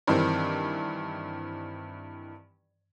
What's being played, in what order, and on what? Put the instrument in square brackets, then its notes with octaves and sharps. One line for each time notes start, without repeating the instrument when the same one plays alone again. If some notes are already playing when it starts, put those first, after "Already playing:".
[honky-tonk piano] G2 D#3 E3 C4